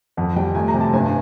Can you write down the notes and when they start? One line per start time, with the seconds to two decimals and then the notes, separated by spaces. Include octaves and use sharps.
0.17 F2 F#5
0.36 G3 G5
0.55 A3 G#5
0.68 A#5
0.74 C3
0.81 A5
0.93 G2 G#5